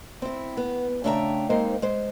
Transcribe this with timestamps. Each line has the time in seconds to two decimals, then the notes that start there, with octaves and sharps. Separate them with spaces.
0.22 C4 E4
0.57 B3
1.04 C#3 A3 D4 E5 G5 A#5
1.50 G#3 A#3 C4 D#4 C5
1.82 G#3 C5